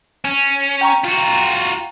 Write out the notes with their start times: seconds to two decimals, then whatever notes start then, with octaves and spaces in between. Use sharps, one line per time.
0.25 C#4
0.81 G5 A#5 C#6
1.05 F4 F#4